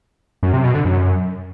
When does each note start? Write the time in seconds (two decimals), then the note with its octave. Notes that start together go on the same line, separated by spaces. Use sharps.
0.43 F#2
0.53 C3
0.64 B2
0.74 D3
0.85 F#2